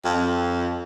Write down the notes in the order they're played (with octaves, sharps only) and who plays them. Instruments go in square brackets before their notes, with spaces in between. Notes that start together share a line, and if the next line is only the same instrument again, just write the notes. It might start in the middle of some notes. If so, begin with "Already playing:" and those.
[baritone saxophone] F2